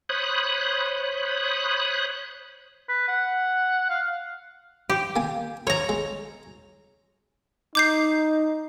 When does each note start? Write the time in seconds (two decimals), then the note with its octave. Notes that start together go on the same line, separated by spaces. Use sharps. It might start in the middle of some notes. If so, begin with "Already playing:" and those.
0.09 C5 C#5 B5 D#6 F#6
2.89 B4
3.08 F#5
3.90 F5
4.90 G4
5.16 A#3 G#5
5.67 A#4 C#5 A#5
5.89 G#3
7.75 D#4 D6 G6 C7